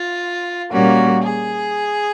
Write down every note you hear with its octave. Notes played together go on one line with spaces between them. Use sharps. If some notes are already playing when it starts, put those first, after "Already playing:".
Already playing: F4
A#2 G3 A#3 C#4 F#4
G#4